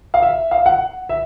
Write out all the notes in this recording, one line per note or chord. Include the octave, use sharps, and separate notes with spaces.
F5
E5
F5
F#5
E5